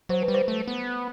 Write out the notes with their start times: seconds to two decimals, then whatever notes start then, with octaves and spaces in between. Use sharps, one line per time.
0.09 F#3 C5
0.22 B4
0.28 G3
0.34 C5
0.48 A3
0.67 B3